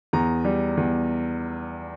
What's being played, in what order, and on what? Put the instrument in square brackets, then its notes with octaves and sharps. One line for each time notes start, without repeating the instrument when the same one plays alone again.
[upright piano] E2 A#5
G3
E2